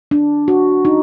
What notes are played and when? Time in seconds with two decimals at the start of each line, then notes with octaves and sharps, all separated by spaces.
0.11 D4
0.48 F#4
0.85 D#4